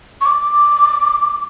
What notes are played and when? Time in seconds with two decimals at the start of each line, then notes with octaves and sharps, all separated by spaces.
0.21 C#6
0.26 D6